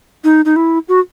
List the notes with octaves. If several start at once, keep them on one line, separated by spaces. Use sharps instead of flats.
D#4
D#4
E4
F#4